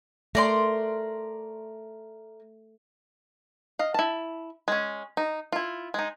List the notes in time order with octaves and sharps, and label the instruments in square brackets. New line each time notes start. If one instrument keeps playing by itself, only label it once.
[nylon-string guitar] A3 [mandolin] A#4 D5 C6
[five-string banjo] D#5 F5
E4 A5
G#3 C#4
D#4
E4 F4
G#3 D#4